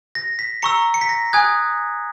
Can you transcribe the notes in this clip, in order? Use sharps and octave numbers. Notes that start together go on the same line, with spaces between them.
A#6
B6
A#5 C#6 E6 C#7
C#7
B6
A#6
G#5 D#6 F#6 G#6